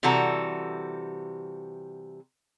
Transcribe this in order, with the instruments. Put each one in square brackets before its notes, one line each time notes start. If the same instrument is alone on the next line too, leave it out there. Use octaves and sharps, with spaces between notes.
[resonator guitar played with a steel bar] C3 E3 G3 F#4 A4 A#5